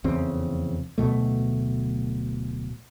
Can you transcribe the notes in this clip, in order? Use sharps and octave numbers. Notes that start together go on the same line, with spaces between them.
F1 E2 C#3 C4
D1 G1 B2 A3